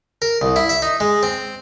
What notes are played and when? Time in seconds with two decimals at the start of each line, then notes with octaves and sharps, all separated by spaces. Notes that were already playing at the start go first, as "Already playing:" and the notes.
0.22 A#4
0.41 C2
0.56 E4
0.69 E5
0.82 D#4
1.00 G#3
1.23 C4